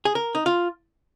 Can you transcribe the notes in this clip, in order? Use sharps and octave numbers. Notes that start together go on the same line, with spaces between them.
G#4
A#4
D#4
F4